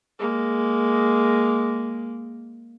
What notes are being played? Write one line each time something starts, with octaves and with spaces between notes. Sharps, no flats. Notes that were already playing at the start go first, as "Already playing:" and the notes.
G#3 A#3